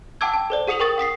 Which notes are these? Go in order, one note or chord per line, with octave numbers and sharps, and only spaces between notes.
F#5 G5 A5 D6 E6 G#6
A5
A4 C5 D5
G#4 F#5 D#6 C#7 F7 F#7
G#4 A#4 G5 C#6 D#6 A6
F#5 D#6 B6 C7